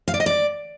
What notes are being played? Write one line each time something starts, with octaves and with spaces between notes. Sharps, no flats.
F5
D5
D#5
D5